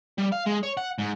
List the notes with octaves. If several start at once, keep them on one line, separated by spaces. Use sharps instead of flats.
G3
F5
G#3
C#5
F#5
G#2